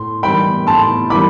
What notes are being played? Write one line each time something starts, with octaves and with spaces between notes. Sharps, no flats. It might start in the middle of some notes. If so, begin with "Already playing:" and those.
Already playing: A2 C6
E3 G3 G5 B5
A2 A5 C6
E3 G3 B5 D6